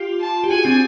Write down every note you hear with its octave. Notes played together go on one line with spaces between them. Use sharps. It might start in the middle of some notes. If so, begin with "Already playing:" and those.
Already playing: F4 G4
A5
G4
F#4 G#4 G#5
C4 D4